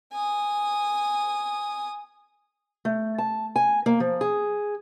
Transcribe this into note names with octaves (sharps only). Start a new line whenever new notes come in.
G#5 D#6
A3
A5
G#5
A#3
F3
G#4